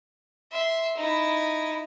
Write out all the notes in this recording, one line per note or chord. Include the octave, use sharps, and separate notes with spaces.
E5 C6
D#4 E4